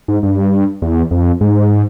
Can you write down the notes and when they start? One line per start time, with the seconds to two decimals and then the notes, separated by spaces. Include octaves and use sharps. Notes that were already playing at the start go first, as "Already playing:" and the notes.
0.08 G#2
0.23 G2
0.82 E2
1.11 F2
1.41 G#2